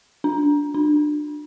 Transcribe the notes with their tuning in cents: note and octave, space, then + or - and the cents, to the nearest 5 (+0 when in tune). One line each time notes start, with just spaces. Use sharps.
D4 -10
D4 +25